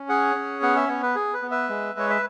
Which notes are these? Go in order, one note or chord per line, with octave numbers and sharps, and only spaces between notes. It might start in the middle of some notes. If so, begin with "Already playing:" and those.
Already playing: C#4
G#4 C#5 F#5
C#4
B3 F#5
E5
B3 C#5
B4
G#4
B4
B3
B4 E5
G#3
G#3 C#5
E5